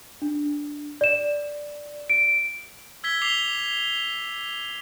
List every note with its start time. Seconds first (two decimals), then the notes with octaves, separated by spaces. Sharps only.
0.22 D4
1.01 D5 E7
2.10 D7
3.04 E6 G#6 B6 G7
3.22 D6 B6 C7 F7 G7